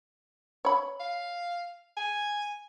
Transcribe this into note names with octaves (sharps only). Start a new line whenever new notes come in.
C#5 B5
F5
G#5